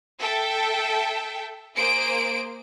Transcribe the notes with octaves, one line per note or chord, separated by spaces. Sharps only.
A4 E5 G5
A#3 G#4 C5 D7